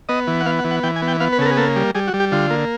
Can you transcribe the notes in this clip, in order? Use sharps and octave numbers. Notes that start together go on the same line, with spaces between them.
B3 D#5
E3
F#5
B3 F5
F#5
E3
F#5
E3 G5
G#5
B3
G5
B3 F5
B4
C#3 A4
A#4
G#4
A#3 A4
G3
G3 G#4
F#4
G3
G4
D3 F4
A#3